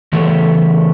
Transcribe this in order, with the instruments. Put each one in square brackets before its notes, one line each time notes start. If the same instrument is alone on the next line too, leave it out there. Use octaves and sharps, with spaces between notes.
[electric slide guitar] C#3 E3 A3 G4 A4